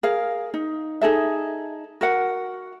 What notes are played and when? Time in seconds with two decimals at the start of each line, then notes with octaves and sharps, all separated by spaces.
0.03 G#4 A#4 F5
0.54 D#4
1.01 D#4 G#4 A4 E5
2.01 F#4 A#4 F#5